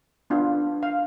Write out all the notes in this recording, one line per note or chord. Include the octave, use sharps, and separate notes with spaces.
B3 D4 F4
F5